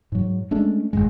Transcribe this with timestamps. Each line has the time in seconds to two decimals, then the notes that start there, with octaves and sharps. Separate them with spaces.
0.12 G#2 F#3
0.51 G#3 A3 C#4 D4
0.93 G1 D#2 G#2 G#3